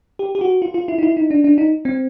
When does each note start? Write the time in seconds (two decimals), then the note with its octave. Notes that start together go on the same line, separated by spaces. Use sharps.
0.19 G4
0.35 G4
0.41 F#4
0.62 F4
0.74 F4
0.88 E4
0.98 D#4
1.03 E4
1.17 D#4
1.31 D4
1.44 D4
1.58 D#4
1.85 C4